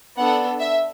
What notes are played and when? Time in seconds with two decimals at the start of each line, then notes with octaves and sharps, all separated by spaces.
0.17 B3 D4 A4 F#5
0.60 E5